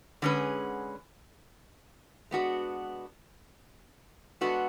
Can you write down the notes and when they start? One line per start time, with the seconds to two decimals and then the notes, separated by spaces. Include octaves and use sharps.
0.22 D3 G#3 C#4 G#4 B4
2.31 G#3 B3 D4 F#4 B4
4.41 G#3 B3 D4 F#4 A4